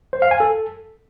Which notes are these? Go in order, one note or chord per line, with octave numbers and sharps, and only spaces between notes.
C5
F5
G#5
A4